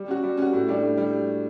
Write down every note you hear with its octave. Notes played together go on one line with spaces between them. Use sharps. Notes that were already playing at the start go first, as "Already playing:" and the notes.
Already playing: G3
C#4 F#4
G3
C#4 F#4
A2
G3 D4
A2
G3